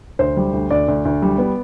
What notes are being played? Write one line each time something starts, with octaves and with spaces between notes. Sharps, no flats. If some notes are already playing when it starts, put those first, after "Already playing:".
D2 C5
G3
D2
D2 D5
D2
D2
G3
B3